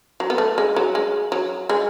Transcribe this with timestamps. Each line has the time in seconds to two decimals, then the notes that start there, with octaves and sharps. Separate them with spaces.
0.20 F#3
0.30 B3
0.38 A3
0.58 G#3
0.76 F#3
0.95 G#3
1.32 F#3
1.69 G#3